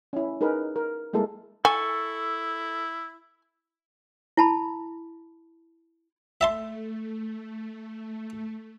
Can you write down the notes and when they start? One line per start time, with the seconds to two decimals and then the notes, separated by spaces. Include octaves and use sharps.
0.13 C#4 E4
0.41 D#4 G#4 A#4 B4
0.76 A#4
1.13 G3 G#3 A#3 E4 A4 A#4
1.65 E4 A4 G#5 C#6
4.37 E4 A5 B5
6.41 A3 E5 A5 C6